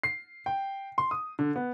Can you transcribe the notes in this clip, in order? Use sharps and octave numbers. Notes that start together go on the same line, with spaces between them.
C7
G5
C6
D#6
D3
B3